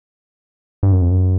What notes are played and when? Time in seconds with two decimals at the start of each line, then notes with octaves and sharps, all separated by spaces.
0.83 G2
0.92 F#2
1.01 F2
1.11 F#2